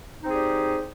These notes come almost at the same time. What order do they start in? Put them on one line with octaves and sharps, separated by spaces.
D#4 C4 G#4 G4 D5